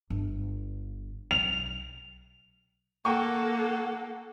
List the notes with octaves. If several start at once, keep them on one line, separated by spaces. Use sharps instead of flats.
G1
B1 F7
A#3 A4 F#5 G5 C#6